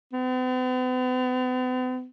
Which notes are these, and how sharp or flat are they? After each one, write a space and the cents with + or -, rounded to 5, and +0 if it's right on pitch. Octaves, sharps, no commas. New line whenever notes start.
B3 +45